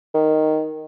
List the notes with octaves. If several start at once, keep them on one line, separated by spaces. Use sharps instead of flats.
D#3